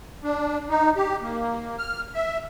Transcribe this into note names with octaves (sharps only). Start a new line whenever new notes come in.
D4
D#4
G4
A#3
F6
E5